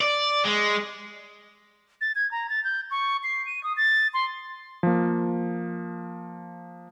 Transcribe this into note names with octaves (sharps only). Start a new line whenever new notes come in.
D5
G#3
A6
G#6
A#5
A6
G6
C#6
C7
D#7
D#6
A6
C6
F3 A#3